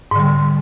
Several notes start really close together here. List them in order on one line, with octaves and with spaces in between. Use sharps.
G#2 D3 G3